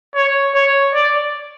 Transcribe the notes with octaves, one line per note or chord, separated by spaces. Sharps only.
C#5
C#5
D5